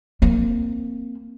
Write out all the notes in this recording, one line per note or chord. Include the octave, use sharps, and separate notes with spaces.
A#3 C4